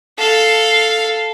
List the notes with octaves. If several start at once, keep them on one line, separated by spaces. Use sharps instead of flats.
A4 F5